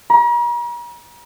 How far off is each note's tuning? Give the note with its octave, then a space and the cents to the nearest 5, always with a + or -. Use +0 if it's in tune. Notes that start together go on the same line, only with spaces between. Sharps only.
A#5 +45